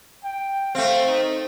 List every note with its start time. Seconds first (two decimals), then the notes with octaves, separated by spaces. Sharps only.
0.24 G5
0.75 A3 C4 F5
1.08 D#4